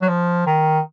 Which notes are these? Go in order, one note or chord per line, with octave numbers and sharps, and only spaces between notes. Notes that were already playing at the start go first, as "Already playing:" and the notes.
F#3
F3
D#3